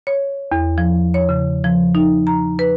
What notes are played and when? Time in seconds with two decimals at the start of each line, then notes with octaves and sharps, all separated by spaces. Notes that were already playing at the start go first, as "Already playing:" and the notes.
0.07 C#5
0.52 E2
0.78 F3
1.14 C#5
1.29 C#3
1.64 F3
1.95 D#4
2.27 A#5
2.59 B4